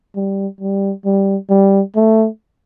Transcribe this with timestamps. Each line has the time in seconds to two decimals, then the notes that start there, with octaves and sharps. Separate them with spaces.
0.16 G3
0.61 G3
1.05 G3
1.50 G3
1.95 A3